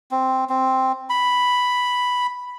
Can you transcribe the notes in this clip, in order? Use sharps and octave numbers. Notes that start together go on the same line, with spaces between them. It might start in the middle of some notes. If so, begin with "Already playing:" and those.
C4
C4
B5